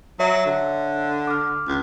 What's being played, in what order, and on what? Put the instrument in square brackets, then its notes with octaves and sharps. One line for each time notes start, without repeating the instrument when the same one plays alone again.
[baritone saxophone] F#3 [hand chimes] C#5 E5
[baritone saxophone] D3
[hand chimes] D6 F6
[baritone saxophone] C#2